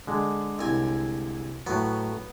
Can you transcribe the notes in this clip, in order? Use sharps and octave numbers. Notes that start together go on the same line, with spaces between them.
D3 G#3
C2 G#5
A2 F#3 B3